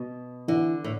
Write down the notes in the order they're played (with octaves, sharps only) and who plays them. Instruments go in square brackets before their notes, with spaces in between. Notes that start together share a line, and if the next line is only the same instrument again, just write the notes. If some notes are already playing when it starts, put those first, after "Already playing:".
Already playing: [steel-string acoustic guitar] B2
[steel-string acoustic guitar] D3 [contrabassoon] E3
[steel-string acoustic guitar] A2